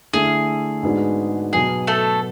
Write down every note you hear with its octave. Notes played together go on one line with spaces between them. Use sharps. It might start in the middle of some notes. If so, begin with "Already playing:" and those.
D3 A3 E4 G#4
G#2 G#3 B3 D4 F#4
B2 F#3 B3 G#4
A3 A4